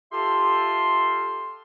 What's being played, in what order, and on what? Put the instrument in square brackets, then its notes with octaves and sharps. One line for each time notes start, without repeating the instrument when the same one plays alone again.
[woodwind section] F4 G4 A4 E5 A5 C6